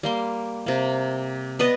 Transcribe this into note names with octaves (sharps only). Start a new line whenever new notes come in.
G3 A#3 C6
C3 A#3
B3 B4 D5 D#5